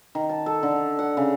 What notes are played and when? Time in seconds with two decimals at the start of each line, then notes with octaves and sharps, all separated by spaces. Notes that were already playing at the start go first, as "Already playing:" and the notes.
0.15 D#3
0.29 A5
0.46 A4
0.63 D3
0.99 F#5
1.17 C#3